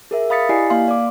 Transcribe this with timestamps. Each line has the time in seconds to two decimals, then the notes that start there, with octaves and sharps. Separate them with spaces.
0.11 G#4 A#4 E5
0.30 F5 B5 D#6 A6 B6 C#7
0.49 E4 G4 D5 D#5 G#5 C7
0.70 A#3 F5 C6
0.88 D5 D6